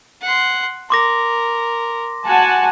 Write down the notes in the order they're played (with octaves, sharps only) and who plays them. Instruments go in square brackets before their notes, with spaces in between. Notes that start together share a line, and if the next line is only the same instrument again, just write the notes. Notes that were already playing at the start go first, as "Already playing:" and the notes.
[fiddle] F#5 C6
[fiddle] A#4 [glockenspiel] C6 D6 A#6
[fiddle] F#4 [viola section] F#5 G#5 A5